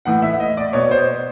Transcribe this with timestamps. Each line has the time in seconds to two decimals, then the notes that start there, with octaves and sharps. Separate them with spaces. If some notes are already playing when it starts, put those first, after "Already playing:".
0.05 A2 E3 F#5
0.22 E5
0.40 D#5
0.57 D5
0.73 B2 C#5
0.91 C5